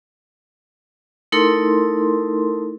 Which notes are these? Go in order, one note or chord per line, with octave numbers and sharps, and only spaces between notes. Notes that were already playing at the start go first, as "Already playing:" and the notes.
A3 D#4 E4 A4 A#4 C6